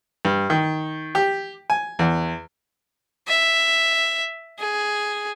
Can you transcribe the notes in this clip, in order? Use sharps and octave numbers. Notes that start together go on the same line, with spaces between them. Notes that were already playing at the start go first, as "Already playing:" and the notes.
G2
D#3
G4
G#5
E2
E5
G#4